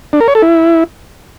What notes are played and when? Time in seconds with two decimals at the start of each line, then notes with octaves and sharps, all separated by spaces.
0.13 D4
0.20 A#4
0.28 C#5
0.35 A4
0.42 E4